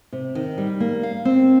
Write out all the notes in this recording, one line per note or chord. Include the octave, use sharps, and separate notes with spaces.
C3
D#3
G3
A#3
F5
C4